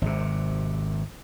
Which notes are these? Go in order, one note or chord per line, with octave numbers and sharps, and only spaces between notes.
G#1 C3